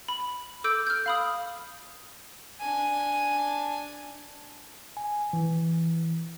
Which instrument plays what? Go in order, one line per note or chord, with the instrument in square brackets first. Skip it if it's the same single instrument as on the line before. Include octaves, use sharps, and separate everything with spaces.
[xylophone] B5
A4 D6 E6 G6 D7
F6 G6
F5 B5 D#6
[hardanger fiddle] D4 G#5
[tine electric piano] G#5
E3